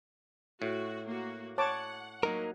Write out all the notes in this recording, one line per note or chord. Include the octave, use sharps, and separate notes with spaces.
A2 F#4
A#3 F#4
C#5 F#5 A5 D6
F#3 A#3 D#4 A#4